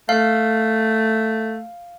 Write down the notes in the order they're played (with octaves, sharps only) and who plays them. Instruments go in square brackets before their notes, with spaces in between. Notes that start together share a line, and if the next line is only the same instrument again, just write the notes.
[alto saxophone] A3 [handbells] F5